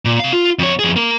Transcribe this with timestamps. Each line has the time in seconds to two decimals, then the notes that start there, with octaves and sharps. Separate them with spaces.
0.05 A#2
0.20 C3 F5
0.33 F4
0.59 F2 C#5
0.79 F2 G#4
0.96 A#3 A#4